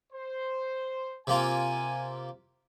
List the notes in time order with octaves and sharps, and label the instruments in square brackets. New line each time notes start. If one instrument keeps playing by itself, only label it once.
[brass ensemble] C5
[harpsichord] C3 A#3 F4 [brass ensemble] G#5